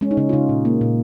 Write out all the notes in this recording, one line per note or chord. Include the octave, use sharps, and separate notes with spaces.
G#3 C#4
D#4
C#3 C#4
F4
C#3 D#4
A#2
A#3
A#2